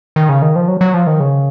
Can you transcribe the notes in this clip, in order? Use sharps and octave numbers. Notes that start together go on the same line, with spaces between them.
D#3
C#3
D#3
F3
F#3
F#3
F3
D#3
C#3